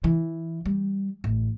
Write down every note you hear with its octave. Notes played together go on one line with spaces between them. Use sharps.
E3
G3
A1